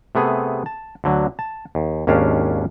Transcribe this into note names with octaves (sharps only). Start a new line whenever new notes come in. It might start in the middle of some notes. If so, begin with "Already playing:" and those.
C3 A3 B3 G#4
A5
D2 D3 F#3
A5
D#2
G#1 D#2 C#4 D4 F5